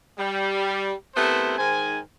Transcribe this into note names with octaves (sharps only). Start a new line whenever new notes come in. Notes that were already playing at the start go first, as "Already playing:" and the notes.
G3
C3 A3 B3 E4 A#4 C5
G#2 D#3 C5 G#5